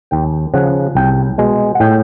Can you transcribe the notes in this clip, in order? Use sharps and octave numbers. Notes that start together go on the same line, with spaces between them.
D#2 G5
C#3 F3 F#5
C2 G5
B2 G#3
F#5
A2 G5